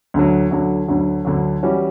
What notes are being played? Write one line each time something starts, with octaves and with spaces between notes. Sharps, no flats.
D2 D3 F#3
D2 D3 F#3
D2 D3 F#3
D2 D3 F#3
E3 G3 C#4 F#4